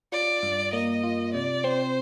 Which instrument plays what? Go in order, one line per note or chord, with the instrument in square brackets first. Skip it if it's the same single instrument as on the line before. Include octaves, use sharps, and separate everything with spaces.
[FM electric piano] F4 [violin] D5
[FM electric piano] G2
[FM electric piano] A#3 [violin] D#5
[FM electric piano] F4
[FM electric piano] C3 [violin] D5
[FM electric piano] C4 [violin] C5